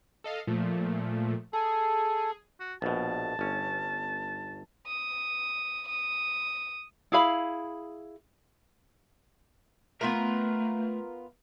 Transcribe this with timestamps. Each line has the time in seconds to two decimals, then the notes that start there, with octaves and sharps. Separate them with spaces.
0.24 A4 D#5 F5
0.47 A#2 F3 A3
1.53 G#4 A4
2.60 F#4
2.82 A#1 B2 A5
3.39 G1 C#4
4.87 D#6
5.88 D#6
7.12 E4 G#4 F5 B5
10.01 A3 B3 F4 A#4